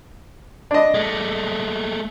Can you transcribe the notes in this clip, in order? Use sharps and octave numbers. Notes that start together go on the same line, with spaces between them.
D4 D#5
G#3 A3